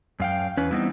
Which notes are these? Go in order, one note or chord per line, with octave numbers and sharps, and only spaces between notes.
F#2 F5 G5
E2 C#4 B4
E3 G3 B3 C4 D#4